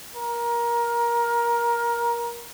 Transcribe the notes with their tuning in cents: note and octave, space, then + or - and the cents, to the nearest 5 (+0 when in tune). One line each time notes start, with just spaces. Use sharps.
A#4 +20